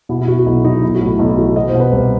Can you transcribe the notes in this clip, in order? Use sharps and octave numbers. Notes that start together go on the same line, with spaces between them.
B2 E4
E4
B2 F#4
F#4
B1 E4
B1 D#4
B1 E4
F#4
A2
E4
B1 E4
E3 F#4
B2 D#5
C5
B2
B4
C2